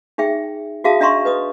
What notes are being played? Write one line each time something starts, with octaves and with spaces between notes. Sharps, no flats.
D#4 G#4 E5 G5
F#4 G#4 E5 F5 A5 D#6
D4 D#5 E5 A#5 C6 C#6
B4 D#5 D#6